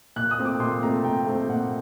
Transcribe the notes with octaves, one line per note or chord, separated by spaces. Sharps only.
A#2 F#6
D#6
A3 C4
D6
A#2 C6
A3 C4 A#5
A#2 G5
A3 C4
A#2 F#5